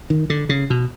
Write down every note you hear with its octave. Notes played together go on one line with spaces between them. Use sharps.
D#3
D3
C#3
B2